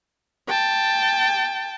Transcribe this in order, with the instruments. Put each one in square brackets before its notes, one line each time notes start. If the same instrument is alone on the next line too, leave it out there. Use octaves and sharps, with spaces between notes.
[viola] G5 A5